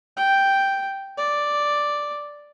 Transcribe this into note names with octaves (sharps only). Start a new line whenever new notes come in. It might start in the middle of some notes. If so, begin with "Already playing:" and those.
G5
D5